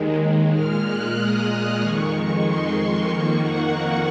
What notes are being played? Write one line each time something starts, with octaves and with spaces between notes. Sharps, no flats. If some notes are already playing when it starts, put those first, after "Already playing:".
Already playing: D#2 D#3 G#3
A#2 G#3 F6
F#6
D#6
F2 D#3 G#3 C#6
C6
F2 D#3 A#3 C#6
F#5
F#5